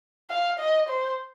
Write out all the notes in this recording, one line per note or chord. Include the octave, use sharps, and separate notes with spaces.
F5
D#5
C5